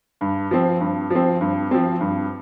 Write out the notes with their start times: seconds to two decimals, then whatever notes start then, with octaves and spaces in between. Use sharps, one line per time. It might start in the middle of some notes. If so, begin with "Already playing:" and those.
0.21 G2
0.51 F3 C4
0.80 G2
1.10 F3 C4
1.41 G2
1.71 F3 C4
2.01 G2